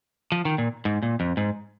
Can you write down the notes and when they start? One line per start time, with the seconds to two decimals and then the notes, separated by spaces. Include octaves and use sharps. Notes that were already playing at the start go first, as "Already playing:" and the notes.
0.32 F3
0.45 D#3
0.58 A#2
0.85 G#2
1.03 A#2
1.20 F2
1.37 G#2